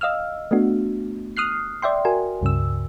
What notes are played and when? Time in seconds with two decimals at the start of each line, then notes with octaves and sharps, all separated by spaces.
0.01 D#5 F5 E6 F6
0.51 A3 B3 D4 F#4
1.37 D#6 F6 F#6 C7
1.82 D5 E5 G5 C6
2.05 F#4 A#4 G#5
2.41 C#2 G2 C#3 E6